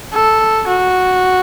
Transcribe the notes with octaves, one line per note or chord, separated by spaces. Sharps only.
A4
F#4